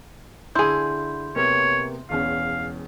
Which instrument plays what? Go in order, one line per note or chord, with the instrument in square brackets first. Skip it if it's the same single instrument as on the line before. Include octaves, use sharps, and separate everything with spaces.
[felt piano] D3 B5 [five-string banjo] E4 G#4 [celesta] C6 G6
[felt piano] C3 A#3 B3 [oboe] C#5
[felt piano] E1 E2 C#4 [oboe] F5